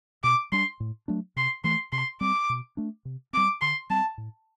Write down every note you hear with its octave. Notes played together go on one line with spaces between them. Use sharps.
B2 D6
G3 D4 C6
A2
F#3 A3 D4
C3 C6
E3 A3 C6
C3 C6
G3 C4 D6
B2
A3 D4
C3
G3 C4 D6
D3 C6
G3 C4 A5
A2